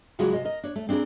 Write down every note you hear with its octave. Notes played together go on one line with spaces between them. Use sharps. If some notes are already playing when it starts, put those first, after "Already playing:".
C#3 F#3 G#3 F4 F#4 G#4
C3 D#5
A#4 D#5
D4 C#5
A3
C4 D4 E4 G#4 A#4